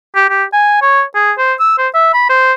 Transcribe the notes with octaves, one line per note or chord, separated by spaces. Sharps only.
G4
G4
G#5
C#5
G#4
C5
E6
C5
E5
B5
C5